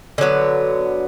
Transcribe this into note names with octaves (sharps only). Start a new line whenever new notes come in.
D3 F#3 B3